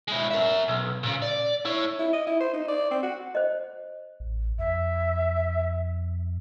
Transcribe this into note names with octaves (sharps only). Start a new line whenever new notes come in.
G#3 E4
A#4 E5
B1
A#2 C#3
D5
E4 C#5
E4
D#5
E4
C5
D#4
D5
C4
F#4
C5 D#5
A1
F2 E5